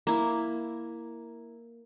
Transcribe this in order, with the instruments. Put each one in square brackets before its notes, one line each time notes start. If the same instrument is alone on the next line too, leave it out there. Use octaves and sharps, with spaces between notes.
[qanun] A#3 E4